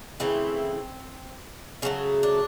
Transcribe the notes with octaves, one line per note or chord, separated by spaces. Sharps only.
C#3 E3 A3 C4
C#3 F#3 A3 C#4
D4